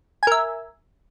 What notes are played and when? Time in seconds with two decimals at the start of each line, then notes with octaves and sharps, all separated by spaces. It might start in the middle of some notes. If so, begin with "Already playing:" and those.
0.23 G#5
0.27 A#4
0.32 E5